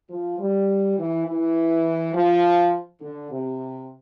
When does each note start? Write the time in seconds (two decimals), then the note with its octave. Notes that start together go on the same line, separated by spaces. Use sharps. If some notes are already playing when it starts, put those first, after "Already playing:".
0.09 F3
0.38 G3
0.97 E3
1.26 E3
2.14 F3
3.01 D3
3.30 C3